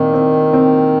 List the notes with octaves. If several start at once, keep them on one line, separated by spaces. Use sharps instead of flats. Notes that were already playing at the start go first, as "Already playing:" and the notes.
Already playing: A#2 D#3 C4
C4
C4